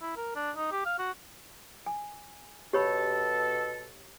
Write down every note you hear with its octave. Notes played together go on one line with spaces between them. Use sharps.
E4
A#4
D4
D#4
G4
F5
F#4
G#5
B2 G4 A4 C#5 B5